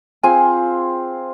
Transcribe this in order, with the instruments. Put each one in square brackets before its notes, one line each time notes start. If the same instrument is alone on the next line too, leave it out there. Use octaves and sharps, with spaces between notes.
[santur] C4 F4 G#4 [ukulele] G#5